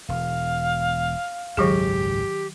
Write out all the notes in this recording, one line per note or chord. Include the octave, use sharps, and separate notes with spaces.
E1 F5
G#1 C#2 F#2 D#3 F#3 G4 G#4